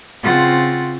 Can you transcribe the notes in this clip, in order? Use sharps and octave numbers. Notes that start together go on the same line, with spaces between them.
C#3 C4 F4 F#5 A6